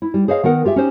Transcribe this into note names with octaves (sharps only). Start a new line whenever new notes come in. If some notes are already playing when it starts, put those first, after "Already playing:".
E4
G3
G#4 C5 C#5 D#5 F5
D#3 B3 A#4 F#5
F4 G4 G#4 E5
C#4 D#4 G4 C5